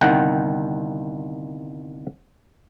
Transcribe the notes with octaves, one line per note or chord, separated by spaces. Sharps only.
G1 C2 D#3 F#5 G5